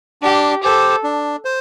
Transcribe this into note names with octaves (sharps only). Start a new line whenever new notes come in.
D4 G4
G4 A4 C5
D4
C5